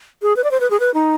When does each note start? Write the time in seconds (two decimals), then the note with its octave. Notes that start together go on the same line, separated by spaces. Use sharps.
0.22 G#4
0.36 B4
0.44 D5
0.51 C5
0.60 B4
0.70 G#4
0.80 B4
0.94 D#4